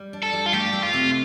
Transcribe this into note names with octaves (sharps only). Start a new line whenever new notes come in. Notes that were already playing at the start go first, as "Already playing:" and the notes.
Already playing: G3
D4
A4
G3
F4
A3 G4
A3
F4
C3